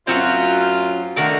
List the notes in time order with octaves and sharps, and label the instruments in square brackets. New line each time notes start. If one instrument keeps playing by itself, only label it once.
[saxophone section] F#2 A2 F4 [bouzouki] C4 F#4 F#5
[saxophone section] D3 A3 [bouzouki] D#3 F#4 A#4